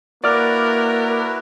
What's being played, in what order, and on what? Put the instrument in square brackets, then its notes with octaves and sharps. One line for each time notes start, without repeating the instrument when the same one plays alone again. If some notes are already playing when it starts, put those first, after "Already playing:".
[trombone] A#3 [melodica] E4 F#4 B4 [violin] A#4 [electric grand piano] D5 D6 F6